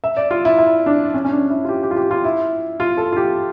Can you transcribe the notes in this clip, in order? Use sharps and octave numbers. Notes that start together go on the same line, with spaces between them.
E5
D5
F4
E4
E4
D4
C#4
C#4
D4
E4
F4
G4
G4
F4
G4
F4
E4
F4
A4
F4
G4